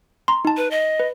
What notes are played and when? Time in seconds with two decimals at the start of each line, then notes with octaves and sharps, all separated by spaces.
0.28 A#5 C6
0.45 D#4 A5
0.57 B4
0.71 D#5
1.00 B4